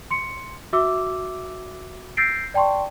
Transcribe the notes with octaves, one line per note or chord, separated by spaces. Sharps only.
C6 C#7
F#4 E5 D6 E6
E6 G6 A6 A#6 C7 D7
D5 G5 A5 C6 C#6